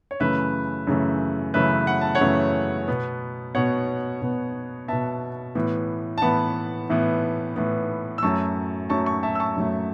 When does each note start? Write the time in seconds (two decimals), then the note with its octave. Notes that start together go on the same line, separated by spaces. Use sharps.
0.11 C#5
0.20 F#2 C#3 E3 A3 B4 E5
0.87 F#2 C#3 E3 A3
1.54 F#2 C#3 E3 A3 B4 E5
1.87 F#5
2.01 A5
2.15 C#5 F#5
2.21 F#2 C#3 E3 A3
2.88 B2 B3
3.55 B2 B3 C#5 F#5
4.22 B2 B3
4.88 B2 B3 E5 A5
5.55 A2 E3 B3
6.18 A5
6.22 A2 E3 B3 F#5 B5
6.89 A2 E3 B3
7.56 A2 E3 B3
8.18 E6
8.23 F#2 F#3 A3 A5 C#6
8.90 F#2 F#3 A3 A5 C#6
9.06 A5 C#6
9.23 E5 A5
9.35 E6
9.40 A5 C#6
9.56 F#2 F#3 A3